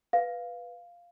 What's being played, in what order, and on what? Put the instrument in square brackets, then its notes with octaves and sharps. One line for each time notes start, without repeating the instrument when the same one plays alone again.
[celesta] B4 F5